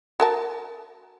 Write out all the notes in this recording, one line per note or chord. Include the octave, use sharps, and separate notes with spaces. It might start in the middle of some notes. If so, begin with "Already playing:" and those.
F#4 A#4 A5